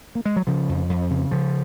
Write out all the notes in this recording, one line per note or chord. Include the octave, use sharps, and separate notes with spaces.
A#3
G#3
F#3
C#3 F3
F2
F2
C#3
C#3 F3